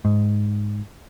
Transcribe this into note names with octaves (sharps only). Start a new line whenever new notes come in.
G#2